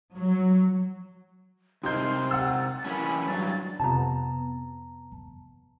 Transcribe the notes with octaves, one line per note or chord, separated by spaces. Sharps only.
F#3
C3 D#4 A#4 C6 G6
F#5 E6 A6
E3 A#3 C#4 B5
G2 F#3 A6
F2 C3 B3 A5 A#5